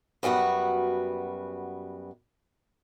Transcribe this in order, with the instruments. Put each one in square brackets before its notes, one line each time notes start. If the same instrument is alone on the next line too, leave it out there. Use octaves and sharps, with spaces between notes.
[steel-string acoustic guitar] F#2 G3 B3 F#4 F#5